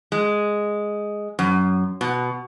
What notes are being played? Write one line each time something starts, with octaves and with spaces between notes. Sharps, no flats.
G#3
F#2
B2